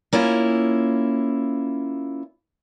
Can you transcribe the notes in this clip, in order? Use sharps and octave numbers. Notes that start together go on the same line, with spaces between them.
A#3 C#4 E4 F4